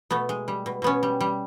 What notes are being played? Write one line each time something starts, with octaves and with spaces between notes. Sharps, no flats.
B2 A3 B3
G#3
G3
B2
B2 B3 C#4
G3
G3